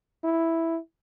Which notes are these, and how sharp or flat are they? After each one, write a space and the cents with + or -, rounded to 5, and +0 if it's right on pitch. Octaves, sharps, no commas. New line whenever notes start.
E4 +0